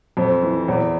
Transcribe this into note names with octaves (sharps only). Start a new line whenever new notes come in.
F2 C5
E3
E2